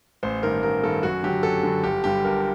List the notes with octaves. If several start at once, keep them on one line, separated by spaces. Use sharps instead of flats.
A1 C5
G2 D#3 A#4
A1 A#4
G2 D#3 A4
F#2 F#4
D3 F#3 G4
F#2 A4
D3 F#3
G1 G4
G2 D3 G3 G4
G1 A#4